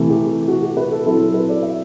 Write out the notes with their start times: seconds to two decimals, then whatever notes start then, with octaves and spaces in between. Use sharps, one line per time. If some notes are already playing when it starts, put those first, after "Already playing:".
Already playing: C3 E3 A3
0.10 G4
0.48 F#4
0.63 G4
0.77 B4
0.91 A4
1.05 F#3 C4 E4 A4
1.20 A4
1.34 B4
1.49 D5
1.63 E5